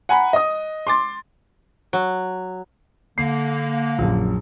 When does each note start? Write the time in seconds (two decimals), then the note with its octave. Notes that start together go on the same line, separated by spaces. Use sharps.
0.09 F#5 G#5 A#5 B5
0.33 D#5 D#6
0.87 C6 D6 A6
1.93 F#3
3.18 D3 A#3 C7
3.98 A#1 F#2